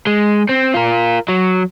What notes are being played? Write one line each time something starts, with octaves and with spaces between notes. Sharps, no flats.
G#3
C4
F4 A#4
F#3